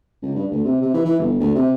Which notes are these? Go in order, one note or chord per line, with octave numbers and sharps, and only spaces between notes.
C#2
G2
D2
C3
C3
E3
E3
G1
D2
C3